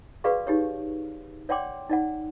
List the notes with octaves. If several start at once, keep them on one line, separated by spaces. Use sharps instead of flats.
F#4 G#4 B4 D5 F5 C#6
D#4 G4 C#5
C#5 D5 F#5 G5 C6 D6
D#4 D5 F#5